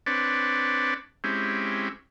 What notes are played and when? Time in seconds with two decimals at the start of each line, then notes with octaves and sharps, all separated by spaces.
0.06 C4 D4 B4 C#5 D5
1.24 G#3 C4 C#4 E4 G4